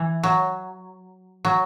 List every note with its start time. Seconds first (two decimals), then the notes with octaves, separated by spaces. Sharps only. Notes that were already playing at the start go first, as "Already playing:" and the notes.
Already playing: E3
0.23 F#3
1.45 F#3